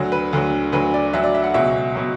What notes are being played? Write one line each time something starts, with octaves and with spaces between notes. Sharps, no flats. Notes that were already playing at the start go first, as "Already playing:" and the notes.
Already playing: D2 D3 F#3
B4
D2 D3 F#3
D2 D3 F#3 B4
D5
D2 D3 F#3 E5
D5
E5
F#5
C#2 B2 F#3 E5
B2 F#3